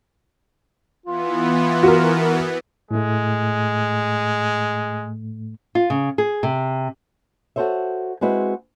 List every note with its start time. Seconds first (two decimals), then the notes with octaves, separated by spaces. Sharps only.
1.06 E3 B3 F4
1.83 F#4 A#4
2.91 A2 G#3 A3
5.75 F4
5.90 C#3
6.18 G#4
6.43 C3
7.56 F#4 G4 A4 C5 C#5 E5
8.21 G#3 C4 E4 F#4 B4 D#5